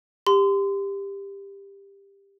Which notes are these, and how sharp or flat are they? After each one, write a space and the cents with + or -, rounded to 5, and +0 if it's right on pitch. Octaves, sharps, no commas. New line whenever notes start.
G4 +15 C6 -30